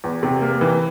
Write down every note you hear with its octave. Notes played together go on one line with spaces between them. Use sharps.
E2
C3
A#3
E3